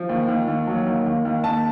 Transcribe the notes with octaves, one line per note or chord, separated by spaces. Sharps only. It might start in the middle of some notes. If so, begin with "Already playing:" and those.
Already playing: F3
D#2
D#2
D#2
F#3
D#2
D#2
D#2
D#2 A5